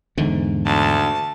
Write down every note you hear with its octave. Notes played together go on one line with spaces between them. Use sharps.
E2 G#2 D3 D#3
D2 A5